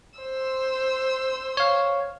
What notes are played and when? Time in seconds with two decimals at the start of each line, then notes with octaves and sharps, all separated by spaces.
0.20 C5 E6
1.57 C#5 F5